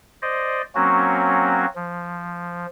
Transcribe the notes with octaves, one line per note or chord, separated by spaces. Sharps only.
C5 D5 D#5
F#3 A#3 C4 C#4 F#4
F3